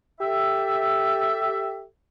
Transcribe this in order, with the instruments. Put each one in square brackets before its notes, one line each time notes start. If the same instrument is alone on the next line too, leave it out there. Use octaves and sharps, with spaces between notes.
[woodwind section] G4 A4 E5